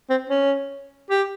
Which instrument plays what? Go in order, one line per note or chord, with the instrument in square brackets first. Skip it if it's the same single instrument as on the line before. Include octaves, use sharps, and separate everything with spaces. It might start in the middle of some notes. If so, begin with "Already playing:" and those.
[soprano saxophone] C4
C#4
G4